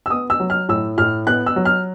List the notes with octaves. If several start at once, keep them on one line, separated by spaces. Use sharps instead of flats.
E6
B3 D#6
E6
F#3
F6
A2 E6
A2 F6
B3 F#6
E6
F#3
F6